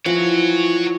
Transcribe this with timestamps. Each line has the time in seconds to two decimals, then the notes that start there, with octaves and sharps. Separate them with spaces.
0.06 E3 F3 C#5 F#5